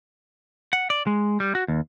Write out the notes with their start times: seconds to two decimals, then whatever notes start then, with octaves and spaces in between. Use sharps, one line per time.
0.73 F#5
0.90 D5
1.07 G#3
1.40 G3
1.55 F#4
1.68 D#2